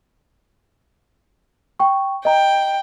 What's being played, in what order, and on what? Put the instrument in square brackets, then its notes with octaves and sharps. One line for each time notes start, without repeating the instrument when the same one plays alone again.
[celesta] G5 C#6
[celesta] D#5 A#5 [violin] G5